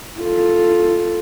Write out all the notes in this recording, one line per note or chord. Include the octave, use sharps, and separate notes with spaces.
F4 A4